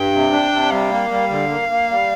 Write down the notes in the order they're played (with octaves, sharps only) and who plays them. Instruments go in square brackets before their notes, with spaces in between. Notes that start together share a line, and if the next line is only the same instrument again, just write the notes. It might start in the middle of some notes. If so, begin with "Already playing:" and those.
Already playing: [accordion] G2 [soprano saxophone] G5
[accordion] C3
D4
C3
[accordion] G3 [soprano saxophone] F5
[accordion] A#3
G3
D3
A#3
A#3
G3